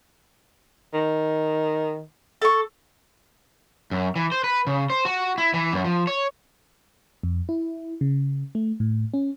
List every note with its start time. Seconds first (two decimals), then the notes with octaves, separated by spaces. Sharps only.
0.93 D#3
2.42 A4 C#6
3.91 F#2
4.16 E3
4.32 C5
4.44 B4
4.67 C#3
4.90 C5
5.05 F#4
5.38 E4
5.54 E3
5.72 F#2
5.85 F3
6.07 C#5
7.23 F2
7.49 E4
8.01 C#3
8.55 A3
8.80 A2
9.14 C#4